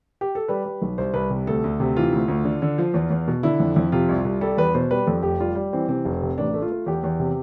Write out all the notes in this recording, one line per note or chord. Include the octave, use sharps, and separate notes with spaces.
G4
A4
G3 B4
G3
B1
C2 C5
C2 B4
C3
D2 A4
D2
C3
E3 F4
D2
D2
D3
D3
F3
E2
E2
B2
D3 E4
F2
F2
C3 F4
C2
C2
G3 A4
E2 B4
B2 C5
G3 B4
F2 A4
F1 G4
G3 F4
G3
E3 C4
C3 C4
F1
C3
A1 D4
A3
F4
A3
E2 G4
E2
C3